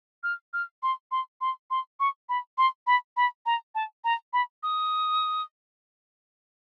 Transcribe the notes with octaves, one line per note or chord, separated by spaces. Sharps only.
F6
F6
C6
C6
C6
C6
C#6
B5
C6
B5
B5
A#5
A5
A#5
B5
D#6